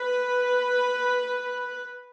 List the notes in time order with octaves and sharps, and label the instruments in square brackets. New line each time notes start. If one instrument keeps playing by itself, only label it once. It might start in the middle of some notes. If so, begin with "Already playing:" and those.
Already playing: [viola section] B4